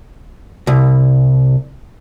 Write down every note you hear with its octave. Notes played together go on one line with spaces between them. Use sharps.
C2